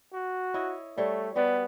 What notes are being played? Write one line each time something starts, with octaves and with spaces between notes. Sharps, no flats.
F#4
E4 C#5 D#5
G3 A3 C5 C#5
G3 B3 F#4 D5